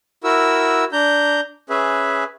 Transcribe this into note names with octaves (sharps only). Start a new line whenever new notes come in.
E4 F#4 A#4 E6
D4 A#5 G6
C#4 G#4 B4 E5